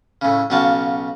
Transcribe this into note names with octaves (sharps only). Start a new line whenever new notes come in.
A2 C#3
B1 C#3 F4 F#4 A5